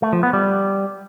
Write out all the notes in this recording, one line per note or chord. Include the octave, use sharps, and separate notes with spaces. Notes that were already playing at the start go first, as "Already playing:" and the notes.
A3
F3
B3
G3